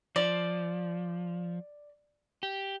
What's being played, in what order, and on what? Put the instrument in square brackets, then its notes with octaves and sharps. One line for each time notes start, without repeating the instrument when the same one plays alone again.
[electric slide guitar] F3 [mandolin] D5
[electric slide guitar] G4